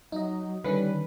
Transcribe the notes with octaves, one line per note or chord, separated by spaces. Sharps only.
F#3 D#4 D#5
D3 D#3 G3 C#4 B4